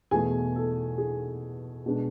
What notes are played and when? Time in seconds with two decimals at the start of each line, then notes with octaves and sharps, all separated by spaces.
0.11 E2 B2 A3 E4 G#4 G#5
0.56 A4
0.98 G#4
1.86 B2 G#3 D4